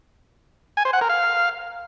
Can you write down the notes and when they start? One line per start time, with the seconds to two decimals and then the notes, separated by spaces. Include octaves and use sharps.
0.77 G#5
0.85 C5
0.93 F#5
1.01 A#4
1.09 F5